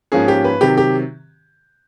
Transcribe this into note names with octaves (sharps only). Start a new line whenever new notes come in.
G#2 F3 A#3 C#4 G#4
G4
B4
C3 D#3 F#3 G4
G4